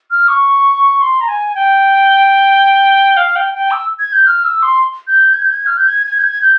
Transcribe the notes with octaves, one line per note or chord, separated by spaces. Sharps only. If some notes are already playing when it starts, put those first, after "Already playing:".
F6
C#6
C6
A#5
G#5
G5
F5
G5
G5
E6
G#6
G6
F6
E6
C6
G6
G#6
G6
G#6
F6
G6
G#6
G#6
G6
G#6
G6